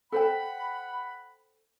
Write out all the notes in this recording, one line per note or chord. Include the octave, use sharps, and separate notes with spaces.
A4 C5 F#5 G5 B5